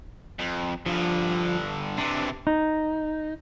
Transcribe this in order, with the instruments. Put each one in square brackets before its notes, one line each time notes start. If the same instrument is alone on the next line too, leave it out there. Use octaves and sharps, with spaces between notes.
[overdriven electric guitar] F2
[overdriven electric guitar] G2 D3 [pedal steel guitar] F3
[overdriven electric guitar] C3 E3 [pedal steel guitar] D4
[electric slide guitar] D#4